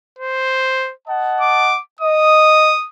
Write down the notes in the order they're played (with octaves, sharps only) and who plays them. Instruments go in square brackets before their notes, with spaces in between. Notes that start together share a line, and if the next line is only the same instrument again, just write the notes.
[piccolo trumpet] C5
[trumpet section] D#5 F#5 A5
[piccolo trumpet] D6
[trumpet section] D#5 [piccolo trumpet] D#6